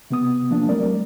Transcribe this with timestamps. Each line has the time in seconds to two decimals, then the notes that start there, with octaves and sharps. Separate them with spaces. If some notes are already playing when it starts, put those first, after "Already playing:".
0.10 C3 B3 D#6
0.51 F3 A#3 D4
0.69 F#3 G3 A3 C4 A#4 D5